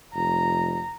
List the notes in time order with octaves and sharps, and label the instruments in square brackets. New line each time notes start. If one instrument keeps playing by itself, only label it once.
[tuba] F1 [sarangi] A#5